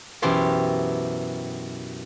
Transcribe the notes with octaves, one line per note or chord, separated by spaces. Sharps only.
F#2 B2 E3 G4 C5 G5